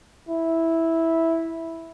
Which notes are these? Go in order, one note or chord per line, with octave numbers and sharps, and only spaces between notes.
E4